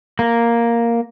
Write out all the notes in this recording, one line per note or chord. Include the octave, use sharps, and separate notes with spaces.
A#3